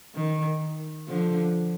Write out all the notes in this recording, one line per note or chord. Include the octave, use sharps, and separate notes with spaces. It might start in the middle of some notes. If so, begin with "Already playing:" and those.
D#3
D3 F3